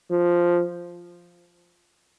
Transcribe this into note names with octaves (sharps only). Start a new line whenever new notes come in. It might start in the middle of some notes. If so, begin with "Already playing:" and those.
F3